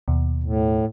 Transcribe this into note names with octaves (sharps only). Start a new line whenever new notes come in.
D#2 B2
A2